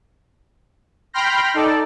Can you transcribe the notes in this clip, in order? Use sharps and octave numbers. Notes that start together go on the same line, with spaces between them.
G5 B5 C6 F6 G6 A#6
D#4 A4 D5